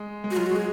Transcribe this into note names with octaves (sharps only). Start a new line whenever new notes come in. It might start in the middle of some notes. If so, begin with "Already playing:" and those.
Already playing: G#3
G#3
F#4
F#3 F4
F#4
G#3 G#4